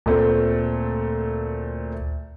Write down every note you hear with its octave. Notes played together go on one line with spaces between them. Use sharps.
D2 A#2 A3 C4